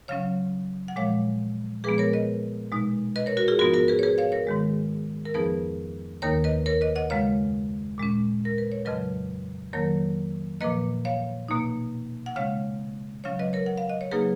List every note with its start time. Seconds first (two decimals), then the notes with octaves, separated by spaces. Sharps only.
0.08 C#3 F#3 C#4 C#5 F5
0.88 F#5
0.96 A#2 F3 G#3 C#5 F5
1.84 A#2 F3 G#3 B3 G#4 B4
1.98 A#4 C#5
2.13 B4 D#5
2.72 B2 G#3 D#4
3.16 B4 D#5
3.26 A#4 C#5
3.37 F#4 A#4
3.48 F4 G#4
3.59 G#2 F3 B3 D#4 F#4 A#4
3.74 F#4 A#4
3.88 G#4 B4
3.99 C#5
4.03 G#4 B4
4.18 C#5 F5
4.32 A#4 C#5
4.47 G#2 D#3 G#3
5.25 A#4
5.34 F2 F3 B3 D#4 G#4 B4
6.22 D#2 D#3 A#3 D#4 A#4 C#5
6.44 B4 D#5
6.66 A#4 C#5
6.81 B4 D#5
6.96 D#5 F#5
7.10 F#2 C#3 G#3 C#5 F5
7.98 A#2 G#3 C#4
8.45 A#4
8.58 B4
8.72 C#5
8.85 F2 C#3 F#3 B4 D#5
9.73 F2 D#3 F#3 A#3 A#4 C#5
10.61 A#2 F3 A#3 B4 D#5
11.05 C#5 F5
11.48 B2 A#3 D#4
12.26 F#5
12.36 C#3 G#3 C#4 C#5 F5
13.24 C#3 F#3 C#4 C#5 F5
13.39 B4 D#5
13.53 A#4 C#5
13.66 F#5
13.78 F5
13.89 D#5
14.01 C#5
14.11 C#3 F#3 A#3 D#4 G#4 B4